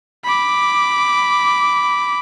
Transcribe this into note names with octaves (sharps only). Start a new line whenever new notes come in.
B5 D6